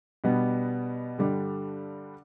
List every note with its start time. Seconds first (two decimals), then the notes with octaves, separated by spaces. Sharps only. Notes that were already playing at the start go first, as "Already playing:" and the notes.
0.24 B2 G3 B3 D4
1.18 G2 D3 G3 D4